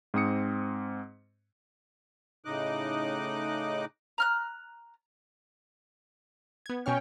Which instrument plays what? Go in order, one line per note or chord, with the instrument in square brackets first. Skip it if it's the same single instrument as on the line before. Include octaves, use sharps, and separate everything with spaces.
[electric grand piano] G#2 C4 D#6 C#7
[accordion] A2 C#3 D#4 D#5 D6 F#6
[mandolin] A#5 F6 F#6
[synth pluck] B3 G#6
[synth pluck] B2 C#6 F6 [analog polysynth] C#4 C#5 G5